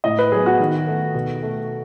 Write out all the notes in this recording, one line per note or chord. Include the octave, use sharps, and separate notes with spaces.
A2 D#5
B4
F#3 B3 G#4
F#4
D#3
A3
B2
A3